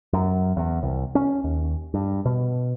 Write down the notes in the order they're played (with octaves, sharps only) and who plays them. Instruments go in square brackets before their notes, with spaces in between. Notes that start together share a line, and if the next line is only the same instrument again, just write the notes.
[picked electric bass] F#2
E2
C2
C#4
D#2
G2
B2